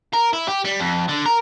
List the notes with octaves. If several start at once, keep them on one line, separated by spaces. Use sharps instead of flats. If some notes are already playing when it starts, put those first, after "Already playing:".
A#4
E4
G4
G3
F2
D3
A#4